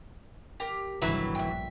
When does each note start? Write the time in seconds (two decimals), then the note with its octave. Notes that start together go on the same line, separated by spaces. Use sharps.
0.60 G4 A#4 G5
1.02 G1 C2 D#3 E3 F#3 E5 A#5 B5
1.35 A#1 E5 G5